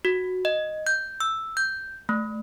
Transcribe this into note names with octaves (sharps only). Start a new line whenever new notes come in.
F#4
D#5
G6
E6
G6
A3